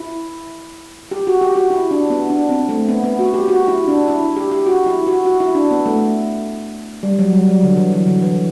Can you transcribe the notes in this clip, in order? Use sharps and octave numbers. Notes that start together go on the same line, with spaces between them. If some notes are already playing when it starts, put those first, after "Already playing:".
Already playing: E4
G4
F#4
G4
F#4
E4
D4
B3
D4
C4
A3
B3
B3
F#4
G4
F#4
E4
D4
E4
G4
G4
F#4
E4
F#4
F#4
E4
D4
B3
A3
G3
F#3
G3
F#3
D3
E3
F#3
D3
E3